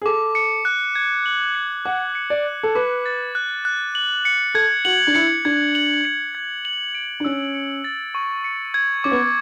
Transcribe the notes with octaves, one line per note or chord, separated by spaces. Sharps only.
G#4
A4 D6
C#7
F#6
G#6
F#7
C#7
F#5 D6
C#7
D5
F#6
A4
B4 D6
A6
F#6
F#6
F#7
C#7
A4 G#6
F#4 F#7
D4
E4 C#7
D4 G#6
F#7
C#7
G#6
F#7
D7
D4
C#4 E6
C#7
A6
C#6
C#7
G#6
C#4 D6
B3